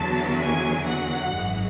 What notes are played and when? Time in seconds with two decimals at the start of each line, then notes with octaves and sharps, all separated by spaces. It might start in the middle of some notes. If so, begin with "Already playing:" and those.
Already playing: E2 D3 F#3 A5
0.41 G#5
0.87 F#5
1.33 G#1 F#2 E3 G#3